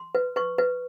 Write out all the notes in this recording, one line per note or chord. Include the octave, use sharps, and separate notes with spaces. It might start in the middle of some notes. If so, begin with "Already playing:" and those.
Already playing: C6
B4
B4 C#6
B4